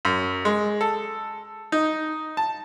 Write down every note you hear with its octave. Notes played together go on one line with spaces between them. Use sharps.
F#2
G#3
A4
D#4
A5